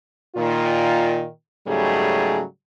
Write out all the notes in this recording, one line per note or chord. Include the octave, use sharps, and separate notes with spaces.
A#2 D#3 F4
G#2 C#3 F#3 G3 A3 G#4